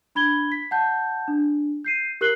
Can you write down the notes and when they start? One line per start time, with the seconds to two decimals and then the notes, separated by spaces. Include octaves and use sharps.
0.15 D4 B5 G#6 G7
0.52 B6
0.71 F#5 A5 G6
1.28 D4
1.84 G6 C7 D#7
2.21 G4 A#4 F#6 C7 F#7 G7